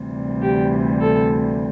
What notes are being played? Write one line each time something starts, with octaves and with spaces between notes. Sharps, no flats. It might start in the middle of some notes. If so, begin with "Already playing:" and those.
Already playing: D2 C3 E3 G3
G4
A4